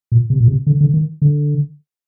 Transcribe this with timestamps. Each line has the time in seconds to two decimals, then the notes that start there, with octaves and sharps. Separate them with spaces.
0.12 A#2
0.30 C3
0.40 A#2
0.48 C3
0.67 D3
0.81 D3
0.94 D#3
1.22 D3